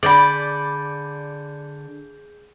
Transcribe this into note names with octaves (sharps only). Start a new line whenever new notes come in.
D3 G#4 D5 B5 G6